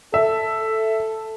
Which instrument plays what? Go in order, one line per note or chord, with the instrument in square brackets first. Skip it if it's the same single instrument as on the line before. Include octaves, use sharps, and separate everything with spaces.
[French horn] A4 [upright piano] E5